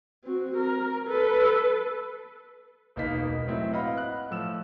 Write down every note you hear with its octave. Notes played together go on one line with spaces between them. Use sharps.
C4 F#4
A#4
A4 B4
E1 C#2 A#3 D#4 B4 B6
A2 F#3 C4 E4
B4 D#5 F5 F#5 B5
F#6
A2 F3 E6 E7